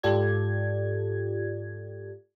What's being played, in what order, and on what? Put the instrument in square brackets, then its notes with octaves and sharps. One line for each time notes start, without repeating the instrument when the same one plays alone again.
[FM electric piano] G#2 F4 G4 A4 D5 G#6